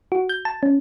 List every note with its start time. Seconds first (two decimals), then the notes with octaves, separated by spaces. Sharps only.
0.12 F#4
0.29 G6
0.45 A5
0.63 C#4